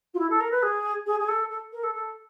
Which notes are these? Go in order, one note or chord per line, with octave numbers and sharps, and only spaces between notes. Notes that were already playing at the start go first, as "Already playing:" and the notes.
F4
E4
A4
A#4
B4
G#4
G#4
G#4
A4
A4
A#4
A4
A4